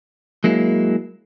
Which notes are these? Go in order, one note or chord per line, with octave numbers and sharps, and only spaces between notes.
F#3 G#3 A#3 E4